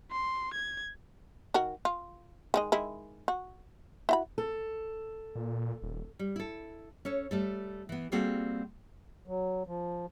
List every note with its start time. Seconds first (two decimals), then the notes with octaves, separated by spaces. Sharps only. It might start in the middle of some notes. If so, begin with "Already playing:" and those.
0.11 C6
0.54 G#6
1.54 D#3 F#4 A#4
1.85 F4
2.54 D#3 G#3 D#5
2.72 D#3 G#3 E4
3.28 F#4
4.09 E4 F#4 B5
4.38 A4
5.36 A#2
5.83 D#1
6.19 G3
6.36 E4 A4
7.05 C#4 A4 C#5
7.31 G3 A3 A4
7.89 E3 B3
8.12 G3 A#3 C4 F#4 G#4 A4
9.27 F#3
9.67 F3